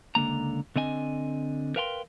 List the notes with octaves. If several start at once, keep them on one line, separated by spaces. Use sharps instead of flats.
C#2 D3 A#3 A#5
D3 C4 D#5 G#5
A#4 B4 F5 G5 G#5 C6